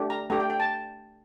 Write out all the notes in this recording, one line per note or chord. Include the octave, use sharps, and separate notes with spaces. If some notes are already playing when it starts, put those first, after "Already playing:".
Already playing: A3 D4 G4
A#5
A3 D4 G4 A#5
G5
G5
A5